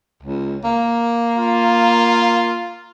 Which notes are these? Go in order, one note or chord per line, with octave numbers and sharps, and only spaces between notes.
C#2
A#3
F4